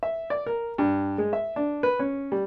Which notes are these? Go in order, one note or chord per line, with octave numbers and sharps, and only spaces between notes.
E5
D5
A#4
G2
G#3
E5
D4
B4
C#4
G3